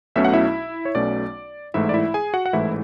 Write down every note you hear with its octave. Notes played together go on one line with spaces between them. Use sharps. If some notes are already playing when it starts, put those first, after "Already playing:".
B1 B2 A3 C#4 E5
F#5
E4 E5
C#5
B1 B2 A3 C#4 D5
A1 G#2 E3 A3 E4 E5
D5
E4 E5
G#4 G#5
F#4 F#5
F#5
A1 G#2 E3 A3 E4 E5